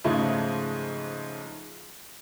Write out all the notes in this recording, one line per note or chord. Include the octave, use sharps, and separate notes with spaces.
G#2 C#3 F3 G#3 A3